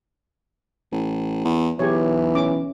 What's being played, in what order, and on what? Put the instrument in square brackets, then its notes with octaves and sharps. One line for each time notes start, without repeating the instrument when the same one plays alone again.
[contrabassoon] A1
E2
[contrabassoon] B1 [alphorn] E3 [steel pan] G4 G#4 C#5
[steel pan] C#4 D6